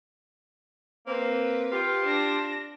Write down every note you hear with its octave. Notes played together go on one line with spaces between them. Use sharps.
A#3 C4 B4
F4 G4
D4 A#6